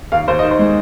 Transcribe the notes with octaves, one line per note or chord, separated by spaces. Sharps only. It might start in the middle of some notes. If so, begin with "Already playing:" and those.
D#2 F5
D#2 C5
D#3 D#5
C5
G#3